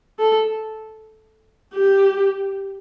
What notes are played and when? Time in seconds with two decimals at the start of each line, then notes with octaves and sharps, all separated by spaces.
0.19 A4
1.75 G4